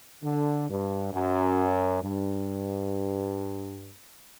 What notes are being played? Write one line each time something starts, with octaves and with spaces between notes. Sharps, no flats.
D3
G2
F#2
G2